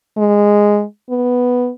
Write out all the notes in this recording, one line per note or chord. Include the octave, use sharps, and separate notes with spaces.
G#3
B3